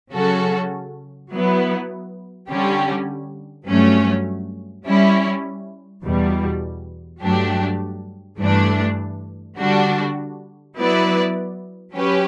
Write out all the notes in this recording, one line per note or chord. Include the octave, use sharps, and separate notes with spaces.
C#3 F#3 C#4 F#4 A4
F#3 B3 E4
D3 G3 C#4 G4
G2 F#3 A3 C#4
G3 C#4 E4
E2 B2 G3
G2 F#3 A3 D4 G4
G2 E3 A3 D4
D3 G3 D4 F#4
F#3 B3 E4 B4 D5
F#3 C#4 G4 B4